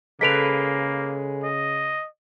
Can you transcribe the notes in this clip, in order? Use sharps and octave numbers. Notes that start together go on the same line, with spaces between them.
C#3 G#3 A#3 A4 B4 B6 D7 F7
D#5